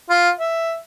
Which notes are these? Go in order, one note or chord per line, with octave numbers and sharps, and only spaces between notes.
F4
E5